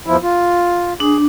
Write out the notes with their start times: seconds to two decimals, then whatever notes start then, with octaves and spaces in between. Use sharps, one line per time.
0.06 E2 F3 E4
0.23 F4
1.00 D4 G#4